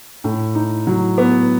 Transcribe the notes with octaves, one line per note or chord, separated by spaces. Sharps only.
A2
D#4
F#3
B3